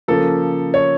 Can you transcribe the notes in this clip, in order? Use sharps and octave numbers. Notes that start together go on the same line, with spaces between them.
C#3 F3 A#3 A4
C#5